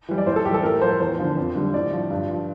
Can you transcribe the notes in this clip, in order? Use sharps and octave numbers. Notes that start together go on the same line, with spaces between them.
E3 G3
D5
A2 C5
A4
E3 G3 G4
A4
A2 A#4
F3 C5
E2 C5
D3 F3
F2
D3 G3
A2 D5
F3
G2
F3